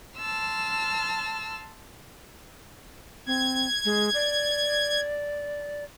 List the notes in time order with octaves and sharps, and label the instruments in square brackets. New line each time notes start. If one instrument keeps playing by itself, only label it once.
[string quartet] A5 C6 E6 F6
[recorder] C4 [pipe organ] G#6
[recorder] G#3
D5